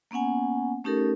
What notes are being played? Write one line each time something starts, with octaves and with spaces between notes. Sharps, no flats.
A#3 B3 C#4 F#5 G#5
A3 C#4 D#4 G4 A4 A#4